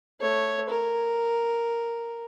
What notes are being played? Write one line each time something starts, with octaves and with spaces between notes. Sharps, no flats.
A3 C#5
A#4